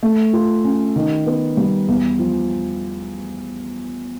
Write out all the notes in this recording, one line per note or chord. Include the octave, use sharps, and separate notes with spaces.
A3
F4
C#4
D#3
B3
G3
E2
F3